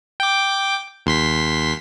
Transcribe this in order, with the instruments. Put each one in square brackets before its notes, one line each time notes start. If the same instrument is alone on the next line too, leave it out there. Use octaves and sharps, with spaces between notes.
[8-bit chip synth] G5 D6
D#2 C6 B6